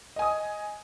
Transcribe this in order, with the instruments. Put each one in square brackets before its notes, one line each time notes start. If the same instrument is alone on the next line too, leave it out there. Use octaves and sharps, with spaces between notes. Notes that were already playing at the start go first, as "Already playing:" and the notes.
[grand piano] D#5
G#5
D#6